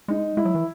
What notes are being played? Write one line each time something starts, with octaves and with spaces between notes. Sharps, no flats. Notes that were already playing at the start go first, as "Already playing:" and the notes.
G#3 D#4
G#3 E4
F#3
E3